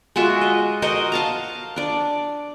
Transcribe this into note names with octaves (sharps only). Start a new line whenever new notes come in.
G#3 F4 F#4 E5
D#5
F#4 A#4 C5 D#5
F5 A5 A#5
D4 D5